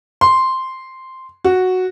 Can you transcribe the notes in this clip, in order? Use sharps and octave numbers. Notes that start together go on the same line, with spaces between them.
C6
F#4